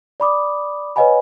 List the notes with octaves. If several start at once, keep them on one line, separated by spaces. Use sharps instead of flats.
D5 B5 D6 D#6
B4 C#5 D#5 F#5 G#5 B5